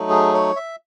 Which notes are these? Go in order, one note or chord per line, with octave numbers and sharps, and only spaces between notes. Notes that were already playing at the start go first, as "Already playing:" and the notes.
Already playing: F#3 A3 D#4
G#4
C#5
E5